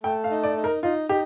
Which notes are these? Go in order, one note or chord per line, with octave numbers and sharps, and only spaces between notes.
A3 G5
F5
D#4
D5
D#4
A#4
D#4 F4
D#4 G4